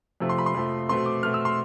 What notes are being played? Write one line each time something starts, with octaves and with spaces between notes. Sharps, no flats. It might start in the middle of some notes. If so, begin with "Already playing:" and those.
F2 C3 F3 A3
C6
B5
C6
F2 C3 F3 A3
B2 A3 C4 C6
D6
B2 A3 C4 F6
E6
C6